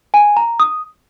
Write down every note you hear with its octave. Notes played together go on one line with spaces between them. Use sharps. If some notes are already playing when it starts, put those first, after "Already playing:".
G#5
A#5
D#6